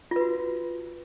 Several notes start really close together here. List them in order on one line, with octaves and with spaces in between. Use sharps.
F4 B4 F#4